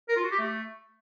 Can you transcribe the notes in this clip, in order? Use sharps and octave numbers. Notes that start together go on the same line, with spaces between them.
A#4
F4
F#4
G4
A3